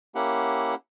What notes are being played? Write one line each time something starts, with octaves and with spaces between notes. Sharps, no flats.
A#3 C#4 E4 G4 F#5